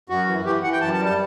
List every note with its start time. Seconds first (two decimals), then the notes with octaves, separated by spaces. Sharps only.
0.09 F#2 F#4
0.27 E3
0.45 E3 G4
0.63 E3 F#5
0.73 G5
0.81 F#2 A5
0.93 A5
0.99 G3
1.05 A5